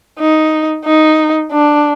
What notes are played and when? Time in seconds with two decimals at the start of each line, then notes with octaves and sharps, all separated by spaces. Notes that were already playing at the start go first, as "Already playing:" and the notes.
0.19 D#4
0.85 D#4
1.52 D4